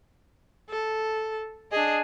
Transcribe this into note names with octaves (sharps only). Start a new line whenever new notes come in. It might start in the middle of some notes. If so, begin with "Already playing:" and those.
A4
D4 G#4 D#5